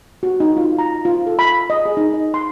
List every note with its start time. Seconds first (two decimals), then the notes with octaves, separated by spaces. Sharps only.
0.23 F#4
0.40 D#4
0.57 F4
0.79 A#5
1.05 F4
1.27 A4
1.39 B5
1.70 D#5
1.86 G#4
1.97 D#4
2.14 D#5
2.34 C6